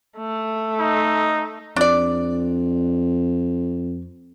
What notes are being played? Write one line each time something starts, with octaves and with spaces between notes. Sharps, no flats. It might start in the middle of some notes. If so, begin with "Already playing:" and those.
A3
D#4
F2 D4 D5